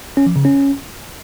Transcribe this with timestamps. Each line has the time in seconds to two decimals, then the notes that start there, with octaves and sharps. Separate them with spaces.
0.17 C#4
0.26 F3
0.36 C#3
0.45 C#4